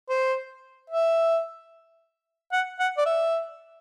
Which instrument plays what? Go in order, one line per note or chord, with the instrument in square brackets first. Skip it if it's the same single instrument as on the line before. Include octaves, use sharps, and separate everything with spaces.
[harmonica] C5
E5
F#5
F#5
D5
E5